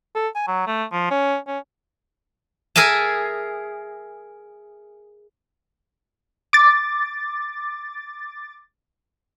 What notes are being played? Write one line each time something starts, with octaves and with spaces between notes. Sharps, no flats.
A4
G#5
F#3
A3
F3
C#4
C#4
G#4 A#4 E5 G#5 A5
D6 A6